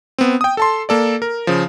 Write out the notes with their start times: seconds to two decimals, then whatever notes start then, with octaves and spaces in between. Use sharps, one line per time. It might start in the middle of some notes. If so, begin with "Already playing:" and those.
0.18 B3 C4
0.41 G5 D#6
0.57 A4 A5 C6
0.89 A#3 A4 D5
1.22 A#4
1.47 C#3 F3